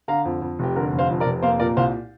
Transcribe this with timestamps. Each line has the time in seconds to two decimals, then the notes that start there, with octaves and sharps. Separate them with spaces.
0.08 D3 F5 A#5
0.25 F2
0.42 F2
0.59 F1 G4
0.76 D3 A#4
0.93 F1
0.98 C5 F5
1.10 F2
1.20 A#4 D5
1.26 F1
1.42 A#3 C5 F5
1.60 A#2 A#4 D5
1.77 C2 C5 F5